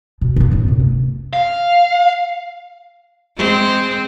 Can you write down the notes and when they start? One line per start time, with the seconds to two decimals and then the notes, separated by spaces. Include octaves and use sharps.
0.21 B2
0.36 G#3 A#3
0.51 F#2 A2
0.68 F#2 C3
0.79 A3
1.33 F5
3.37 G#3 C4